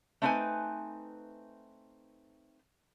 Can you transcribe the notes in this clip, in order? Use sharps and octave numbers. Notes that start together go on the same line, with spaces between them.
A3 C4 D4 D#4 B4 G#5